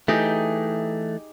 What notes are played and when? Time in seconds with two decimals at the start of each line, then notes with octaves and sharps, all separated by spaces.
0.08 E3 A3 D#4 G4 G#4